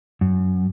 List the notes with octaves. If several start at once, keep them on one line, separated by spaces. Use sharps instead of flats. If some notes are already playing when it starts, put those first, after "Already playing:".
F#2